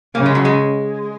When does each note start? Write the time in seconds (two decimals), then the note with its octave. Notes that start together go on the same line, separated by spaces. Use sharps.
0.15 C#3 A#3
0.26 G#3
0.35 F#3
0.45 G#3